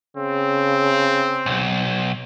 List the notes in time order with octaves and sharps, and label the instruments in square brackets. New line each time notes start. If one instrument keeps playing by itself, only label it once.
[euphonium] C#3 [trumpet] C4
[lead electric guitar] B1